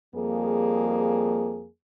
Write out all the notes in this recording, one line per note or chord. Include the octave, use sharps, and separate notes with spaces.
F2 G3 A#3 G#4